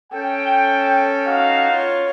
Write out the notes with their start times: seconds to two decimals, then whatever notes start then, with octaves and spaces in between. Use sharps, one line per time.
0.13 C#4 A4 G5
1.27 D#4 F#4 F5
1.71 F4 C#5